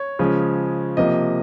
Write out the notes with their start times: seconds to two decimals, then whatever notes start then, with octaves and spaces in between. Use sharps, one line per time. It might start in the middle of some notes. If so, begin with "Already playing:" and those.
Already playing: C#5
0.19 C#3 F3 G#3
0.97 C3 F3 A#3 D#5